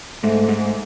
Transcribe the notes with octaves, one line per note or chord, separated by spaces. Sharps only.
G#2 A3
G#2